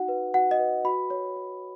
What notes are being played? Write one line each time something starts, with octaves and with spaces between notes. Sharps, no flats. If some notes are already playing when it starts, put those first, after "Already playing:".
Already playing: D#4 F#4 F#5
B4
F#4 F#5
D#5
B4
F#4 B5
C#5
C#5